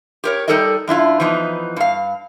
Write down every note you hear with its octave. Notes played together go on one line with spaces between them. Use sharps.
G4 A#4 C#5
G3 D#4 A4 A#4 D5 D#5
F#2 D4 E4 F4
E3 F3 B3 D#4
G2 F5